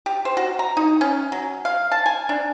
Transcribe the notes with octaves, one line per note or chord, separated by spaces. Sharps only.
G4
C5
F#4
A#5
D#4
C#4
F#3
F5
A5
G#5
D4